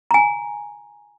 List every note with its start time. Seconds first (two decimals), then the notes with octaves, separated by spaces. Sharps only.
0.11 G#5 A#5